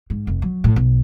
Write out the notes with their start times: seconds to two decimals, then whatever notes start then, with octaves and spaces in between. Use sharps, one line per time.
0.10 G#2
0.27 F1
0.42 F#3
0.64 A2
0.76 B1